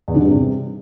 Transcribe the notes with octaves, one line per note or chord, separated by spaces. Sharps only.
E2
D3
G2
C3